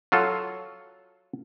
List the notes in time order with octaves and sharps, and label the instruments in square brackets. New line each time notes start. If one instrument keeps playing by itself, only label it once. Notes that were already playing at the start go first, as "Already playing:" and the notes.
[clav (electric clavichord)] F#3 F4 A4